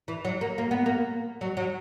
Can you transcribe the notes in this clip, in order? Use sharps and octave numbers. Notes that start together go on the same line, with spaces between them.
E3
F#3
A#3
A#3
B3
A#3
F#3
F#3